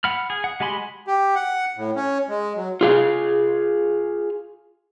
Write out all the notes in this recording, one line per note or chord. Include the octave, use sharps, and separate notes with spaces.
F#5 B5 F6
G#4
F#5
G#3 G4 G#5 B5 C6
G4
F#5
A2
C#4
G#3
F#3
F4 G#4 F5